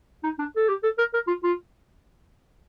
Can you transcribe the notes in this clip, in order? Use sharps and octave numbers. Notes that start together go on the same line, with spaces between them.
D#4
D4
A4
G4
A4
A#4
A#4
F4
F4